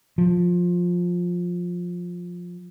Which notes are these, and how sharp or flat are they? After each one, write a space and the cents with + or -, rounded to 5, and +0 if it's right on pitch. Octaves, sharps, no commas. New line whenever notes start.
F3 +15